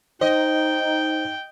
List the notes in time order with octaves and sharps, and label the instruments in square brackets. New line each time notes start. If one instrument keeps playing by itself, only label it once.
[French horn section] D#4 [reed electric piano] C5 [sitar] D#5 [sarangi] G5